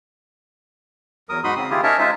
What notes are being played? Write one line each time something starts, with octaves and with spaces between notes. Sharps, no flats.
E2 F#3 A#4 D#6
G#2 D#4 F#4 B5 C6 D#6
C#3 C4 D#6
D#3 A#3 E4 F4 G4 G#4
C#4 D#4 A#4 C#5 E5 A5
G#3 D#4 F4 C5 E5